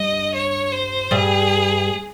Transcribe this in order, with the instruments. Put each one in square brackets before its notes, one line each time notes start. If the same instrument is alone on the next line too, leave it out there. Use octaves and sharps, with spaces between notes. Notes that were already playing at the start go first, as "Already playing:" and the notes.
Already playing: [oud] G2 [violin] D#5
[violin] C#5
C5
[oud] G2 G3 [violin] G#4